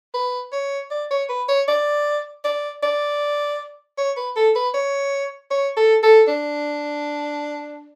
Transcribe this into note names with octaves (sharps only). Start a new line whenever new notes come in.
B4
C#5
D5
C#5
B4
C#5
D5
D5
D5
C#5
B4
A4
B4
C#5
C#5
A4
A4
D4